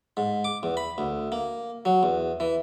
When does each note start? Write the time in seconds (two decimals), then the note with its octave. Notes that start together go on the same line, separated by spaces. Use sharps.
0.17 G#2
0.44 D6
0.63 E2
0.77 B5
0.98 D2
1.32 A#3
1.85 F#3
2.03 E2
2.40 E3